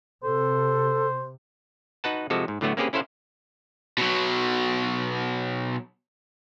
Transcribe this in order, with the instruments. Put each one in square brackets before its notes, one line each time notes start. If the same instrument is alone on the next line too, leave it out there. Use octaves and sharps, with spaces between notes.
[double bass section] C3 [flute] A4 [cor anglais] C5
[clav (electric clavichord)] D#4 F#4 B4 F#5 A5
C3 F3 G#3 F#4 A4
G#2
A2 D3 F#3 A3 B3 F#4
A#3 C4 C#4 G4 G#4 B4
C#4 E4 A4 C5 F5 F#5
[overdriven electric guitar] B2 F#3